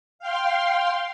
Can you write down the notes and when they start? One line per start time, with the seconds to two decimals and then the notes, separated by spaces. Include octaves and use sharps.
0.19 F5 G5 C6